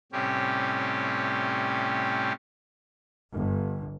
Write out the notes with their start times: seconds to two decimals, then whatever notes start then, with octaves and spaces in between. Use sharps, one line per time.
0.12 A2 C3 G3 C#4 G4
3.34 G1